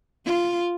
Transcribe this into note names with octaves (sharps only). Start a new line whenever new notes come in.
F4